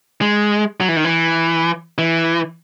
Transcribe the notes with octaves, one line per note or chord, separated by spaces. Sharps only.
G#3
F#3
E3
D#3
E3
E3